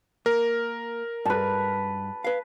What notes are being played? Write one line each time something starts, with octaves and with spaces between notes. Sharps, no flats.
A#3 A#4
G2 B4 A5
B4 F5